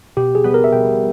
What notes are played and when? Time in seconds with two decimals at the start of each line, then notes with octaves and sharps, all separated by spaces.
0.17 B2 G4
0.35 G#4
0.44 G3 B3
0.54 A#4
0.64 E5
0.73 B2 G5